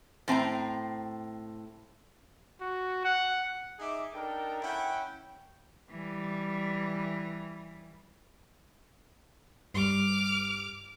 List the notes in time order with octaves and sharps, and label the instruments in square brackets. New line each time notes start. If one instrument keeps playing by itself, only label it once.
[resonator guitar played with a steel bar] A2 C4 G#5 A#5
[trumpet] F#4
F#5
[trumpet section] D#4 G#4 E5 D6
D4 D#4 A4 A#4 G5
C#4 E4 F#5 G5
[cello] E3 G3
[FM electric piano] G2 G3 [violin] D6 F6